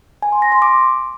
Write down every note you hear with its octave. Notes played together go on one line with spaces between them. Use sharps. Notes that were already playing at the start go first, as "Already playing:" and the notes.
G#5
C6
A#6
C6
D6